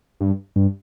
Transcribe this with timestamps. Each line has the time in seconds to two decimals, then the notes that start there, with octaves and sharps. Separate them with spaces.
0.21 G2
0.56 G2